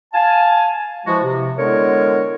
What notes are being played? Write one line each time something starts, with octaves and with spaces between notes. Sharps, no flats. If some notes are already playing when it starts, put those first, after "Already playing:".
F5 G#5 A5
E3 F3 G#3 F#4
C3
D3 G#3 B3 E4 A#4 C#5